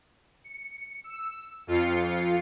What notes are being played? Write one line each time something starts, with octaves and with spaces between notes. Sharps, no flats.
C#7
E6
F2 F4 C7 C#7